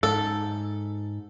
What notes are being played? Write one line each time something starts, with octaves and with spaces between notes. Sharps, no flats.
G#2 A4